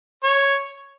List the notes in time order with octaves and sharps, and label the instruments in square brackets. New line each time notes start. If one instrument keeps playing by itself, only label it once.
[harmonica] C#5